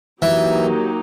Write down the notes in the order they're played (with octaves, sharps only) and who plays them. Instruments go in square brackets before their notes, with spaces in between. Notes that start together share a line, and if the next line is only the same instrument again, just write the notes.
[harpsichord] E3 [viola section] F#3 A#3 D#4 G4